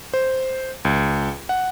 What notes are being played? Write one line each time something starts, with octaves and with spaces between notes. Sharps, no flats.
C5
C#2
F#5